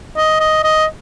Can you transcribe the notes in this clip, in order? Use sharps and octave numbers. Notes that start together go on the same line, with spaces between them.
D#5
D#5
D#5